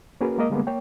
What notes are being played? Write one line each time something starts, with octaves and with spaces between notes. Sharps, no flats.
A#3 C#4 F#4 G#4 A#4 B4
G#3 A#3 A#4 D#5
D3 G3 G#3 A#3 B3
A#3 C#5 G5